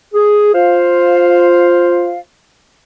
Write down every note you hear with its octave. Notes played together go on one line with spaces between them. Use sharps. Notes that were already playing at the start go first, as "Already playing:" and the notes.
G#4
F4 C5 F5